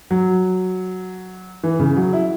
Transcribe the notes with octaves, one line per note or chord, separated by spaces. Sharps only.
F#3
E3
C#3
F#3
E4